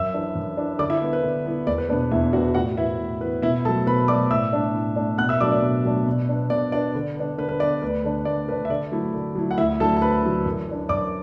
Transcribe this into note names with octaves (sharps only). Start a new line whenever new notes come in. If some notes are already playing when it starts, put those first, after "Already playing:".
Already playing: F#2 E5 E6
E3 D4
F#2
E3 D4
D3 D5 D6
E4 E5
B3 E4
B4
D3
B3 E4
E2 D5
B4
B2 B3 D4 B4
E2 E4 E5
B2 B3 D4 F#4 F#5
A2 F#4 F#5
E3 B3 E4 E5
A2
E3 B3 B4
B2 E4 E5
F#3 A3 A4 A5
B2 B4 B5
F#3 A3 D5 D6
A2 E5 E6
A3 D4
A2
A3 D4
B2 F#5 F#6
E5 E6
F#3 A3 D4 D5 D6
D5
B2
F#3 A3 D4
B2
B3 D4
B2 D5
B3 D4 D5
D3
B3 D4
D3 B4
B4
B3 D4 D5
D2 B4
D3 A3 D4
D2 D5
D3 A3 D4 B4
E5
D3 D5
F#3 A3 E4
D3
F#3 A3 E4
F#5
D2 E4 E5
D3 F#3 A3 E4 A4 A5
A5
D2 B4 B5
D3 F#3 A3 E4
F#2
E3 D4
F#2 D5 D6